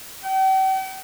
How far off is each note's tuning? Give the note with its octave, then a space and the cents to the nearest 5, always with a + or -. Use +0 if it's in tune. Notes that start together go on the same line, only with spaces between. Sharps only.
G5 -45